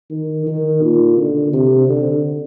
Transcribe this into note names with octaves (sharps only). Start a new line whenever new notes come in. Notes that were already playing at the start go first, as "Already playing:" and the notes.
D#3
D#3
A#2
D3
C3
D3